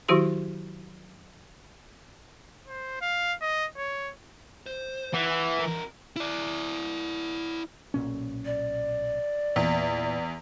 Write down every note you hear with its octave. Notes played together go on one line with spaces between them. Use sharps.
D#3 F#3 E4 F#4 G4 C6
C5
F5
D#5
C#5
C5
E3 E4 F#5
F2 A#4
E4 D5
B1 A#2 C#4
D5
E2 A#2